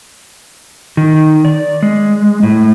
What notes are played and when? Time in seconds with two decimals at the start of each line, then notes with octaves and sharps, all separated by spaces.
0.97 D#3
1.45 D5
1.83 G#3
2.43 A2